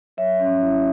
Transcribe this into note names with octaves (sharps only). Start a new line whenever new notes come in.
F#3 C#5 E5
C#4
E4